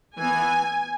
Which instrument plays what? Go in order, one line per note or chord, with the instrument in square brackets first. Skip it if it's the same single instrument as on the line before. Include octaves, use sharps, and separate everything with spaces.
[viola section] E3 B3 G#5